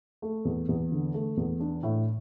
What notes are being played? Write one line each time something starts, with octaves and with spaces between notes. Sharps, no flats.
A3
E2
E2
D3
A3
E2
D4
A2